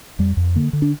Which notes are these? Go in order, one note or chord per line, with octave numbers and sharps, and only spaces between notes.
F2 G3
F2
D3 A#3
D3
D4